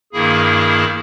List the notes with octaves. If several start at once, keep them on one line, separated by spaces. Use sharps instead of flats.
G2 D#3 A#3 E4 G#4